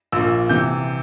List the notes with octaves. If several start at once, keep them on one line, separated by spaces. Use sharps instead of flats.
A#1 A#2 E6
C3 E3 G6